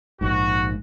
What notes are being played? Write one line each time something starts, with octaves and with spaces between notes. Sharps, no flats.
A#1 G#2 F#4